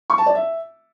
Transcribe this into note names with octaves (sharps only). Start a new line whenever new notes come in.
C#6
A5
D5
E5